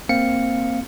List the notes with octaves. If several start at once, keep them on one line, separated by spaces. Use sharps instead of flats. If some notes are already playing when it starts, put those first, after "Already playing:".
A#3 C4 F5 C#7